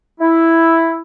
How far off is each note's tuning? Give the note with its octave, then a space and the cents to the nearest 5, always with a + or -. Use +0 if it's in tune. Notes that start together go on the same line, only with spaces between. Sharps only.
E4 +0